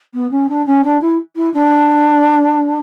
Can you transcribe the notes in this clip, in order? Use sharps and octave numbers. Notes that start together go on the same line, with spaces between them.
B3
C#4
D4
C#4
D4
E4
E4
D4